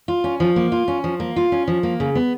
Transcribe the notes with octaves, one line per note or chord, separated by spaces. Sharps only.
F4
C#4
F3
A#3
F4
C#4
F3
A#3
F4
C#4
F3
A#3
C#3
B3